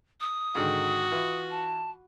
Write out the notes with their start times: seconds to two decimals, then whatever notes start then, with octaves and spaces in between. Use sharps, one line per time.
0.20 D#6
0.55 G#2 D3 D#3 F#4
1.12 E3 F4
1.50 A5